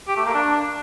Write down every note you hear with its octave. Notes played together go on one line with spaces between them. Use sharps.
G4
A3
A#3
D4